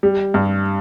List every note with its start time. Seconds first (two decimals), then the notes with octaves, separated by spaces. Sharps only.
0.03 G3
0.34 G2